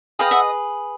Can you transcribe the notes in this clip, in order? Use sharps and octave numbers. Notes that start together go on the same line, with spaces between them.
G#4 B4 D#5 F5 G5
E5 F#5